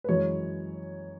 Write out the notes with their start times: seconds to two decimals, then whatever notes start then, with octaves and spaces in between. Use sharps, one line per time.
0.04 B4
0.09 F#2 E3 G#3 C#5